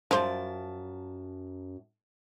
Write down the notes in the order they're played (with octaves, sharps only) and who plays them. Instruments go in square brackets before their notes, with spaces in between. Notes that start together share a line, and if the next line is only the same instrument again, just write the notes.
[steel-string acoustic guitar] F#2 A5 [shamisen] F3 C5